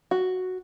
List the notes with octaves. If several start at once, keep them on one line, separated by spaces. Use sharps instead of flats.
F#4